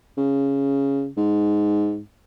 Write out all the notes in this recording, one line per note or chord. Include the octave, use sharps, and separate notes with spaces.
C#3
G#2